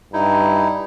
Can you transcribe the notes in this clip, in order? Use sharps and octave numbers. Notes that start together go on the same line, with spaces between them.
G2 D#4 E4